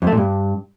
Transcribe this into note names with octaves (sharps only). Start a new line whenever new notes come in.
F2
A3
A#2
G2